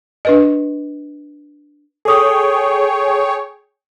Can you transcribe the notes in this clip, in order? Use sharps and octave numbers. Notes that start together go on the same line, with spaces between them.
D4 B4 D#5
G#4 A4 C#5 G5 D#6